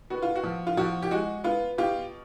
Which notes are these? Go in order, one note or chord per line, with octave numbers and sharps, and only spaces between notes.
B3 F#4
F4
F#4
F3
F4
F3 F#4
G4
G#3 F#4
B3 F4
B2 F4 G4